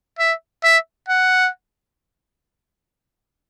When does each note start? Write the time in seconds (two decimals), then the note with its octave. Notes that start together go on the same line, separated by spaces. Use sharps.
0.19 E5
0.64 E5
1.09 F#5